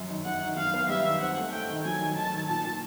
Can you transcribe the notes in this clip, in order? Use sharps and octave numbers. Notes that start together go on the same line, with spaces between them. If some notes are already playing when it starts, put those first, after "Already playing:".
Already playing: F#2
D#3
F#2 F#5
D#3
F#2 F5
B3
G3 E5
D#3
C4 F#5
A3
A3 G5
D#3
F#3 G#5
D#3
D#3 A5
D#3
A#2 A5
A#2